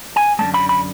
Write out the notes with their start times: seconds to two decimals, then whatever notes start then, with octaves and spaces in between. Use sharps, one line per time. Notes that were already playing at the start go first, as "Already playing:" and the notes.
0.16 G#5
0.39 F#2 D3 G#3 A5
0.54 B5
0.69 B5